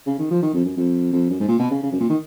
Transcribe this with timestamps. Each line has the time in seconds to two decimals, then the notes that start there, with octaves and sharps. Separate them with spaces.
0.06 C#3
0.19 D#3
0.30 F3
0.42 D#3
0.53 F2
0.65 F#2
0.77 F2
1.12 F2
1.30 F#2
1.40 G#2
1.48 A#2
1.59 B2
1.71 C#3
1.83 C#3
1.92 F#2
2.00 A#2
2.09 D#3